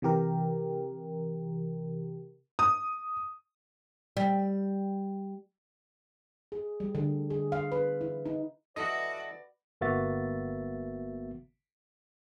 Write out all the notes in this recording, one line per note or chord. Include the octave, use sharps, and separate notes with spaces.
C3 E3 G4 A#4
D#6
G3
G#4
G3
D3
G#4
F5
B4
E4
D#4
E3 E4 F#4 A4 B4 D5 D#5
G1 A#3 B3 F#4 E5 A6